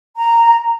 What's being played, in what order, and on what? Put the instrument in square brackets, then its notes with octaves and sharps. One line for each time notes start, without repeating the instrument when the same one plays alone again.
[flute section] A#5